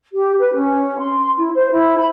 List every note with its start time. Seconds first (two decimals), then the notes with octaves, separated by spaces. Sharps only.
0.13 G4
0.39 B4
0.54 C#4
0.99 C6
1.36 E4
1.54 C5
1.71 E4
1.97 B5